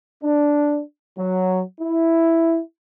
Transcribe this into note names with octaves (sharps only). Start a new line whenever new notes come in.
D4
F#3
E4